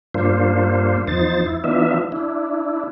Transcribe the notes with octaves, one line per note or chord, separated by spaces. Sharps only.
G2 A#3 D4 F4 C5
E2 F3 D#4 C5 A6
E4
E3 B3 D4 D#4 F4 E5
D4 E4